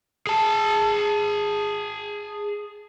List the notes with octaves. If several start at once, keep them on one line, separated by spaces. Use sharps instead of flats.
G#4 A5